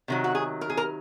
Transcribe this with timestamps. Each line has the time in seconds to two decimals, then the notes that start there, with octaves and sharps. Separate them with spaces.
0.08 C3 D#3 F#3
0.24 F#4
0.35 G#4
0.61 A#4
0.70 G#4
0.77 A#4